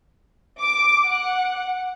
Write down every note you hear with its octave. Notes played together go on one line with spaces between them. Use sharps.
D6
F#5